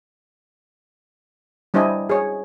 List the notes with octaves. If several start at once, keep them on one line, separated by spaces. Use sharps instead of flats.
G3 D4 E4 C5 D#5 G#5
G#4 C#5